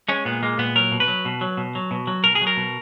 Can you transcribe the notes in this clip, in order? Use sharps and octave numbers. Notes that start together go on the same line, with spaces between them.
G#3 C#4
A#2 B3
G#3 A#3
A#2 B3
F#3 A#4
B2
B4
F#3
B2
F#3
B2
F#3
B2
F#3
B2 A#4
G#4
F#3
A#4
B2